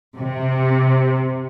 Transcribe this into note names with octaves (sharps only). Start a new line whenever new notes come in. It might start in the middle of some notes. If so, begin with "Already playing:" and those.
C3